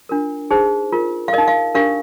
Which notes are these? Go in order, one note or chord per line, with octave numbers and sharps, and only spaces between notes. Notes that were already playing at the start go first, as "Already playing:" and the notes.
D4 F4 A#4
D#4 G#4 C5
F4 A#4
F5
A#4 D#5
D#4
F5
D4 G4 A#4 F5